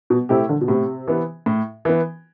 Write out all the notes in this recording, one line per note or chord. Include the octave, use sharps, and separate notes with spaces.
B2
C3 A3 E4 G4
D3
B2
A2 C3
E3 B3
A2
E3 B3